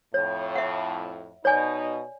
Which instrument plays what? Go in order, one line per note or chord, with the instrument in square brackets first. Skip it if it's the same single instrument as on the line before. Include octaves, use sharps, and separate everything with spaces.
[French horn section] F2 A2 [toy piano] C#5
[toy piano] E5 F#5
[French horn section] B2 D#4 [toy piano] C#5 D5 G#5